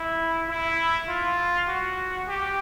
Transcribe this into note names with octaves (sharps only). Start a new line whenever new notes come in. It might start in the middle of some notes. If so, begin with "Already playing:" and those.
Already playing: E4
E4
F4
F#4
G4